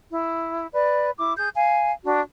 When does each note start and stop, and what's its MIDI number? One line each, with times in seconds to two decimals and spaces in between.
0.11 0.66 64
0.74 1.10 71
0.74 1.10 74
1.17 1.33 64
1.17 1.33 86
1.36 1.48 68
1.36 1.48 91
1.55 1.91 77
1.55 1.91 80
2.04 2.20 62
2.04 2.20 66